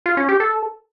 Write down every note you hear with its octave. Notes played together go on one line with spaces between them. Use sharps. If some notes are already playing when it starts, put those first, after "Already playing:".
F4
C#4
G4
A4